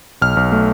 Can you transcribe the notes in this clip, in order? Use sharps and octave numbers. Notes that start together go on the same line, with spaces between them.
B1 F6
B1
A3